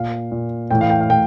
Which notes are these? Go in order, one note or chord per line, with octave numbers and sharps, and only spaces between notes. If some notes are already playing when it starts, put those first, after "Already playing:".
Already playing: A#2 F5
A#2
A2 E3 G5
F5
G5
F5
A2 G5